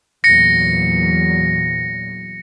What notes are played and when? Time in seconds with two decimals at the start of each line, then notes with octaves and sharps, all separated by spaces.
0.24 E2 A#2 F#3 A#6 C#7